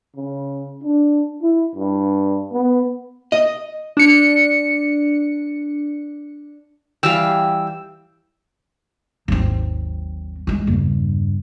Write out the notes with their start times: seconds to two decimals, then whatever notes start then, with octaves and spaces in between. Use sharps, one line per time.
0.16 C#3
0.83 D4
1.42 E4
1.75 G2
2.52 B3
3.32 D#5
3.97 D4 C#7
7.03 E3 G3 F5 G5 E6
9.28 G#1 D#2 G#2 F#3 C4
10.47 E3 G#3
10.67 E2 G2 C#3 A#3